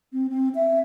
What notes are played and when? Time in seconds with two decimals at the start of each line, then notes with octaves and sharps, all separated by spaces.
0.13 C4
0.30 C4
0.55 E5